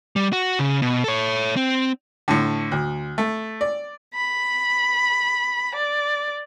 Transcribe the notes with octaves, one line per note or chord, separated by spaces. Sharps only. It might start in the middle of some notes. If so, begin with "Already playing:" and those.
G3
F#4
C#3
B2
A4 C#5
C4
A2 D3
D2
A3
D5
B5
D5